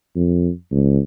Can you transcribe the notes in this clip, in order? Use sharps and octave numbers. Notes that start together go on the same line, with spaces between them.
F2
C#2